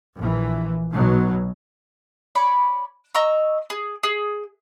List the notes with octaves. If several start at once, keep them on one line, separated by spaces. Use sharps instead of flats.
A#1 E3
B1 B2 F#3
C#5 D5 B5
D#5 A#5 C#6 E6
G#4
G#4